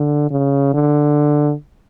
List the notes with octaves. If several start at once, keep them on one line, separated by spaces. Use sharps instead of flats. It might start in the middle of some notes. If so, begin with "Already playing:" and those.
Already playing: D3
C#3
D3